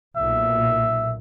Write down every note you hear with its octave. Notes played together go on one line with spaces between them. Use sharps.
B1 A#2 E5